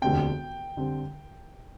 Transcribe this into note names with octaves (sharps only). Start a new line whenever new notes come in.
E1 D2 D3 G3 C4 G5
D3 G3 C4